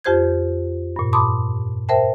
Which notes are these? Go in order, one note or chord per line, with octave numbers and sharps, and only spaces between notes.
F2 F4 G4 C5 G6 G#6
G2 A#2
A5 B5 C6 D6 D#6
A#4 C5 E5 G5 A5